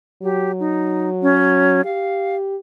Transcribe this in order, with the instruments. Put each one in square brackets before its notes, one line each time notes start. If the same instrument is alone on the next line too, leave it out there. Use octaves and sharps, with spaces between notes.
[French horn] F#3 [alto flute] G4
[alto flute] D#4
C#4
[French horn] G4 [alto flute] F5